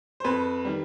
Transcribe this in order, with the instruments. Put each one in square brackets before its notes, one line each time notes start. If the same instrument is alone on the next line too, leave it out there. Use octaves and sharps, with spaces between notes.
[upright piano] C5
F2 B4
D#3 G3